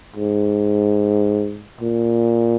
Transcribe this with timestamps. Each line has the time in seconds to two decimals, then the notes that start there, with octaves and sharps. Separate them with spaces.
0.16 G#2
1.81 A#2